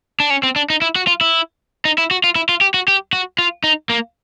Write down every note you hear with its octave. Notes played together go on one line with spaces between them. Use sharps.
D4
C#4
C4
D4
D#4
E4
F#4
F4
E4
D#4
E4
F#4
F4
E4
F4
G4
F#4
G4
F#4
F4
D#4
A#3